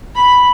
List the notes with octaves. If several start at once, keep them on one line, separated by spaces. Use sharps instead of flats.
B5